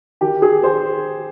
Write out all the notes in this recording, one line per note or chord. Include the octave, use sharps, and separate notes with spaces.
D#3 G4
G#4
C5